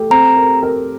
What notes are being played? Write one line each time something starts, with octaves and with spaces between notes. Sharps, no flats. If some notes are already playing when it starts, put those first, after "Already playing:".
Already playing: A3 G4
C4 A#5
A#4
A#4